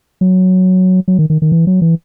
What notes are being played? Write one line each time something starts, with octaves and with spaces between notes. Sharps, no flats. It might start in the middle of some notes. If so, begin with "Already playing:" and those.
F#3
F#3
D#3
D#3
D#3
E3
F#3
E3